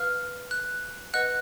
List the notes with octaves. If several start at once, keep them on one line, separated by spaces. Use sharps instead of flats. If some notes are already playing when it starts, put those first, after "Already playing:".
Already playing: B4 F5 F6
F#6
B4 D#5 F#5 F#6